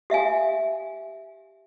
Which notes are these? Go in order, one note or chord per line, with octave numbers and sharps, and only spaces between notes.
G4 E5 F5 G#5